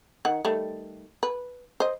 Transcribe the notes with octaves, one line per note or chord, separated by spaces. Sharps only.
D#3 F#5
D#3 G3 A3
B4
C5 D#5